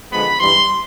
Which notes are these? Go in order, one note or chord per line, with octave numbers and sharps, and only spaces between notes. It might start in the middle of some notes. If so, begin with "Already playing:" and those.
D3 F3 G#3 B3 B5
G2 E3 G3 C6